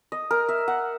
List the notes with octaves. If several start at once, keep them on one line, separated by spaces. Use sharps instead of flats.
D#5
A#4
E5
F#5